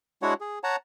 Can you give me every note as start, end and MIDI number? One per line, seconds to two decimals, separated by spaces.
0.22 0.34 56
0.22 0.34 62
0.22 0.34 64
0.22 0.34 66
0.22 0.34 73
0.22 0.34 78
0.41 0.59 68
0.64 0.76 73
0.64 0.76 78
0.64 0.76 81
0.64 0.76 82